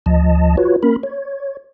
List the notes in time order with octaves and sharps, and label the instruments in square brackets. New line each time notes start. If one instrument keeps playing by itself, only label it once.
[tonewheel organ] D2 F3 D#5 A5
F4 F#4 B4 C#5
A#3 C#4 A#4 B5
C#5